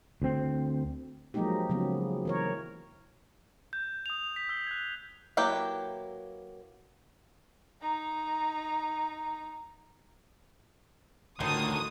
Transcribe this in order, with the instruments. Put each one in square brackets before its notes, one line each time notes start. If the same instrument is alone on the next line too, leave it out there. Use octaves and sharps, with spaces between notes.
[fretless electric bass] D2 C4
[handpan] F3 F#3 G#3 A#3 D#4 G4
C#3 F3 F#3 B3
E3 A#4 C#5
[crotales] G6
D#6 F7
B6
E6 B6 C7 G7
F#6 G#6
[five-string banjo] F#3 A#3 E4 G4 B4
[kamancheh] D#4 A#5
[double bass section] D2 [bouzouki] A2 F4 G#5 [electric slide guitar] D3 D#3 [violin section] D#6